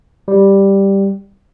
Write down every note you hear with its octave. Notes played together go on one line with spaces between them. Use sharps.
G3